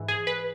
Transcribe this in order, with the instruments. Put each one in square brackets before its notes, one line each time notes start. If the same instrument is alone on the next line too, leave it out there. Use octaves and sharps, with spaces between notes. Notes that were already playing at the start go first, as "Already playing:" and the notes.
Already playing: [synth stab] G#2 E3
G#4
B4